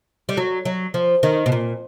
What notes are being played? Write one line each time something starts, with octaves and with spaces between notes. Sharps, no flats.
G3
F#3
F#3
F3
D#3
B2
A#2